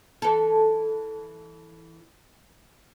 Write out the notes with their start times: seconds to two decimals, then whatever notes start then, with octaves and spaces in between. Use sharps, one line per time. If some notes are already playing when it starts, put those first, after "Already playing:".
0.22 E3 A4